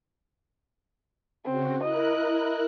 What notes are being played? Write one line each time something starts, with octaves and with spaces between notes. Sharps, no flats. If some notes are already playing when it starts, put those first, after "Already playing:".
C#3 C4 F#4
E4 A#4 D#5 F#6